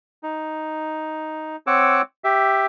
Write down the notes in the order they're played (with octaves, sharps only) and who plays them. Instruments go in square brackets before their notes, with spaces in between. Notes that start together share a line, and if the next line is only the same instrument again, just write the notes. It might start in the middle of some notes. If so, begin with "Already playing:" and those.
[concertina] D#4
C4 C#5 F#5 D6 E6
G4 E5